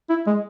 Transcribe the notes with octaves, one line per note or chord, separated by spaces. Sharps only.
E4
G#3